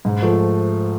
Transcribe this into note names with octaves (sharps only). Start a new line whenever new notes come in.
G#2
F3 A3